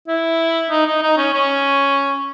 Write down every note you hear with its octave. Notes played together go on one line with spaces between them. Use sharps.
E4
D#4
D#4
D#4
C#4
C#4